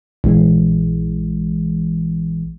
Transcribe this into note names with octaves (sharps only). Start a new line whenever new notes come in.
A#1 E3 G#3